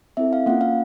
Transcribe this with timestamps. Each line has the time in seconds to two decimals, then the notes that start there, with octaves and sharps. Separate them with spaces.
0.17 C4 E4 A4 E5
0.33 F5
0.46 A#3 C#4 F4 F#5
0.61 F5